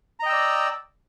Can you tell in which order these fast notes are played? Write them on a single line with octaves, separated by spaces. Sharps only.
A#5 D#5 G5 E6 D5